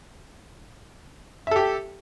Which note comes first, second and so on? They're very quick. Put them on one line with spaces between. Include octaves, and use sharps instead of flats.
E5 A4 G4